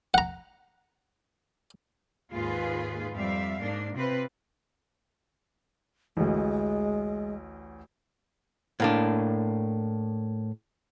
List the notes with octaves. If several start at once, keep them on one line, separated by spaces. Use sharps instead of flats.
F#5 A#5
D#2 G#2 F4 G#4 B4
F2 G3 E5 F5
G#2 A#3 D4
C3 C4 F4 B4
A1 D2 G#3
A2 A#3 D4